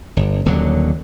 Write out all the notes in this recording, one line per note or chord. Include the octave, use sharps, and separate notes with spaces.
G1
D#1 D#2 D3 F#3